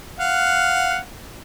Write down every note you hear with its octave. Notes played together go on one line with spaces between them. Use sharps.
F5 F#5